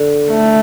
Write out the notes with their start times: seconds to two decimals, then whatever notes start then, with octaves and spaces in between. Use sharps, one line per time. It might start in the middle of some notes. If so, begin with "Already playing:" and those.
Already playing: D3
0.31 A3